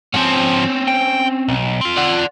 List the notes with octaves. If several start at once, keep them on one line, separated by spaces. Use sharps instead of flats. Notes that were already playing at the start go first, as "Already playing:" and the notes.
G#2 F3 C4 C#4
G5
B1
C4 F4
D5 F#5